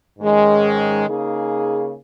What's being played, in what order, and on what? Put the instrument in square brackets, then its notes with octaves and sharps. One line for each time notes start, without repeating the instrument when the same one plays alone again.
[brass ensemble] G#2 D#3 G#3 C#4
C#3 A#3 D#4 G#4